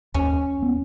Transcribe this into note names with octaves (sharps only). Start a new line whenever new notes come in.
D#2 C#4
B3